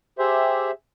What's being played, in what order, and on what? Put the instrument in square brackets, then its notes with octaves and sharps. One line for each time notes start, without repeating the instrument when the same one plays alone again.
[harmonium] G4 G#4 C5 E5